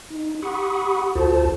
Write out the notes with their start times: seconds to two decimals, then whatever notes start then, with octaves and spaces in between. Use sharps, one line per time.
0.10 D#4
0.42 G4 F#5 B5 C#6 D#6
1.15 D2 F4 F#4 A4 C5 A5